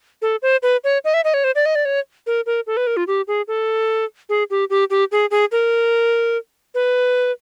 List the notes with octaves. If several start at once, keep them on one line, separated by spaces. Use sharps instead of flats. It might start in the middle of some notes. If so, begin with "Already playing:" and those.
A4
C5
B4
C#5
D#5
E5
D#5
C#5
C5
D5
D#5
D5
C#5
A#4
A#4
A4
B4
A#4
F4
G4
G#4
A4
G#4
G4
G4
G4
G#4
G#4
A#4
B4